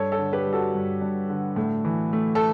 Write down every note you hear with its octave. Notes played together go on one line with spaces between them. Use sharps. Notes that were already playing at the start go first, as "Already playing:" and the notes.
Already playing: G2 A4 C#5
A4 C#5
D3
G4 B4
G3
F#4 A4
G2
G2
D3
A2
E3
A3
A4